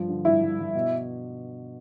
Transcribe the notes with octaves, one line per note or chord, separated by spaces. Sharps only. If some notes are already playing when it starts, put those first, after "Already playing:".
Already playing: G2 F3
D3
G2 E4
G2
G2
B2